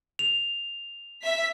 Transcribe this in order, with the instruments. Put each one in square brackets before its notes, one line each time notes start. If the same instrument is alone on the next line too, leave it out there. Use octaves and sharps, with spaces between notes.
[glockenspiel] F7
[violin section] E5 B6